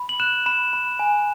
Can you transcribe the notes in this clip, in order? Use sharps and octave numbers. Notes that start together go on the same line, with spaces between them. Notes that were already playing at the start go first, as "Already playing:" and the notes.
Already playing: B5
F#7
F#6 E7
B5 E7
B5
G#5